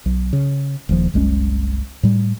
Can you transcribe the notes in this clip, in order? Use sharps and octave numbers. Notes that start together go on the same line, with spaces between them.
B1
C#3
D#1 D#2 F3
F#1 C2 G#3 C#4
A2 G3